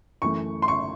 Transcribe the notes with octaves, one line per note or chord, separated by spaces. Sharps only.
F#2 E3 A3 C#6
C6
C#6